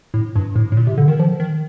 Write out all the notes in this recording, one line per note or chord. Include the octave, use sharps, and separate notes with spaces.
A2
G2
A2
A2
A#2
C3
D3
D#3
F3
D#3